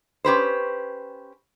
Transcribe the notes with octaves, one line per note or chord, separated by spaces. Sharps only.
C#4 G4 B4 C5